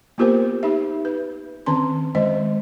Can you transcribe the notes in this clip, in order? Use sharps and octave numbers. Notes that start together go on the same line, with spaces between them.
A#3 B3 F4 G4 A#4 C5
D#4 G4 E5
B4
D#3 C4 C#4 A#5 C6
D#3 G#3 C5 D#5